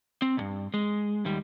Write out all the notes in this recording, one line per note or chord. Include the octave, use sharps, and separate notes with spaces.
C4
B1 G2
G#3
D#2 G3